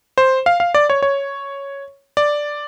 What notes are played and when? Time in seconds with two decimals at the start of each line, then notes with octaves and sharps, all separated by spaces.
0.18 C5
0.46 F5
0.60 F5
0.74 D5
0.90 C#5
1.03 C#5
2.17 D5